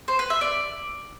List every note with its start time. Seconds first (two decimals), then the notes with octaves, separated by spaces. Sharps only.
0.08 C5
0.19 B4
0.30 E5
0.41 D5